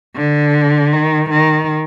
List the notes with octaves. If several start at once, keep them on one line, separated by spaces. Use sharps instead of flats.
D3
D#3
D#3